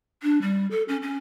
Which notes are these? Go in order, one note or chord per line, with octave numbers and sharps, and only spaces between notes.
D4
G3
A4
C#4
C#4